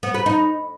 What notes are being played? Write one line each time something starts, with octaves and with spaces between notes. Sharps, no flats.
B3
B4
D#4